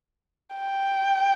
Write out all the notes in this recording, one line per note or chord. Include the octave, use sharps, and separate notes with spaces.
G5